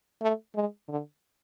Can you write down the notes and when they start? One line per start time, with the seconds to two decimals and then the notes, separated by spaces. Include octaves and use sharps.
0.21 A3
0.55 G#3
0.88 D3